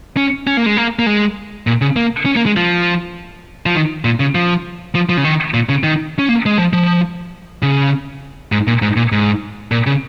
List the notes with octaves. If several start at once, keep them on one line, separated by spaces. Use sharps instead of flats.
C#4
C#4
A#3
G#3
A#3
A#3
G#3
A#2
C#3
A#3
C#4
A#3
G#3
F3
F3
D#3
A#2
C#3
F3
F3
F3
C#3
D#3
A#2
C#3
D#3
C#4
A#3
G#3
F3
F3
C#3
G#2
A#2
G#2
A#2
G#2
A#2
C#3